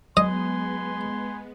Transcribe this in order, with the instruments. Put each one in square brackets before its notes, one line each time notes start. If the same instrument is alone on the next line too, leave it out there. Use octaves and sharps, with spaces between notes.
[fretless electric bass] F#3 [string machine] G#3 B3 [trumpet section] B4 G#5 C6 [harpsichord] D#5